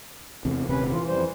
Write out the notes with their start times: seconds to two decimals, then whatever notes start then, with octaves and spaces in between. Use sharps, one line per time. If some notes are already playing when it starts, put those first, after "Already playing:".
0.45 E2 C3
0.69 D#1 C3 C#4 B4
0.92 E3 F4
1.08 F2 G3 C5